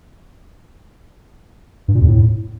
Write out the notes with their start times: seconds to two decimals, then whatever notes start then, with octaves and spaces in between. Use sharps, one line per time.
1.88 G2
1.95 A#2
2.01 E2
2.08 A2